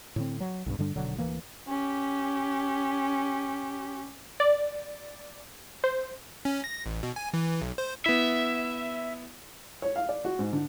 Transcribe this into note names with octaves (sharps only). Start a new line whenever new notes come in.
A2 D3 C4
F#3
B1 G2
G2 D3 G3 D4
D#1 B2 D3 F#3
D1 G1 E3 A#3
C#4 G4
D5
C5
C#4
A#6
A1
B2
G#5
E3
B1
C5
B3 E4 E5
C#5
F5
D5
F#4
G#2
D3